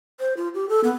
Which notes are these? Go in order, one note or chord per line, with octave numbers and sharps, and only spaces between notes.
C5
F4
G4
A4
B3